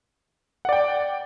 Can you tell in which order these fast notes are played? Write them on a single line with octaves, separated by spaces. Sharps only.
F#5 D5 G5